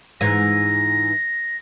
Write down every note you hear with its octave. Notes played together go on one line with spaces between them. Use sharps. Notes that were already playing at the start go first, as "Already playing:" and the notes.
G#2 E3 A#6